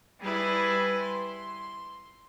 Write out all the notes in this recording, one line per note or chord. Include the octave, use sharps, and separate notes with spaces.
G3 E4 G#4 B4
C6